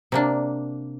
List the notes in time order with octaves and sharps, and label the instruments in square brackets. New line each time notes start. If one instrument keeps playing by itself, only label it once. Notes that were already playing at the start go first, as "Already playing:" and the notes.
[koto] C3 A#3 D4